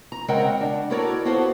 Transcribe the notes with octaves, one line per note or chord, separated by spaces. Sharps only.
A#5
C#3 G#3 C4 A#4 F#5 G5
D4
E4 F#4 A4 A#4 C#5 D5
B3 F4 F#4 A4 B4 C5